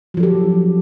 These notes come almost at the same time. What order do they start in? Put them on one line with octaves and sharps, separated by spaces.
F#3 F3 A4 G4